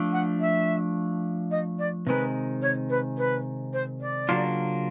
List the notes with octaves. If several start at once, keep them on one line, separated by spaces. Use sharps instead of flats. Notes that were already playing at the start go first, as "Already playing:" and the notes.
Already playing: F3 A3 D4
F#5
E5
D#5
D5
C3 D#3 G#3 B4
C#5
B4
B4
C5
D5
C#3 F#3 A#3 D4 F4